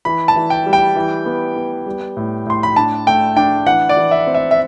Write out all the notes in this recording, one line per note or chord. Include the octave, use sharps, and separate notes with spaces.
E3 B5
A5
E3
G5
G3
G5
E3
B3
B3
G3
A2
A2 C6
B5
D4 A5
A3 G5
D4 G5
E3 F#5
D5
E3
E5
C4
E5
E5